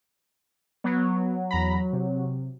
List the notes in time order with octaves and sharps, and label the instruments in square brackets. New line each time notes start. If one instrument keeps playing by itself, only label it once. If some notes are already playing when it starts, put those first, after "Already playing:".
[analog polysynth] F#3 [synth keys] B3
[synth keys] E2 A#5 B5
C3